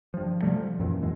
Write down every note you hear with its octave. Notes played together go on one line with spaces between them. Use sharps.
G2 F3
C3 G3 A3
F3
F#2 A#2 E3
F#2 E3 G#3